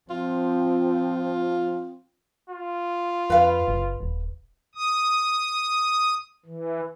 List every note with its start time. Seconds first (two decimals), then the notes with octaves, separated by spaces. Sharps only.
0.10 F3 C4 F4
2.50 F4
3.30 F2 B4 F5
3.68 F#1
4.01 D#1
4.75 D#6
6.46 E3